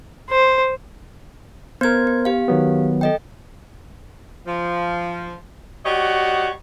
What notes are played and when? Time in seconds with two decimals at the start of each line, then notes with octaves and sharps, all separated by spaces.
0.30 C5
1.81 B3 A#4 C5 G#6
2.07 B3
2.25 G4 F5
2.48 D#3 F#3 B3
3.01 A4 D#5 G5
4.47 F3
5.86 G3 F#4 C#5 D#5 F#5